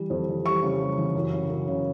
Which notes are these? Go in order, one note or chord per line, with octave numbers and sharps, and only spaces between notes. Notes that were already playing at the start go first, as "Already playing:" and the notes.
Already playing: E3 G3
F2
E3
G3 C#6
C#3
G3
E3
F#2
C#3
F#2
C#3